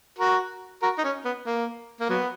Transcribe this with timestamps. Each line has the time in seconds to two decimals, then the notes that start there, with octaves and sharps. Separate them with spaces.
0.19 F#4 A#4
0.82 F#4 A#4
0.98 D#4
1.04 C#4
1.25 B3
1.46 A#3
2.00 A#3
2.09 F#3 B3